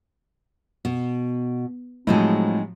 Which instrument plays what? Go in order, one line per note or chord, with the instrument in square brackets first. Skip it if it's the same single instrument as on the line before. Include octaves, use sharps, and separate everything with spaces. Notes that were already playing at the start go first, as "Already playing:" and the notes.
[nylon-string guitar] B2
[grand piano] A2 F3 F#3 [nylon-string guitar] G#3 C4 D#4